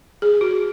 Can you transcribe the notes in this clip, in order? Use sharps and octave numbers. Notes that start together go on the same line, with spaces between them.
G#4
F#4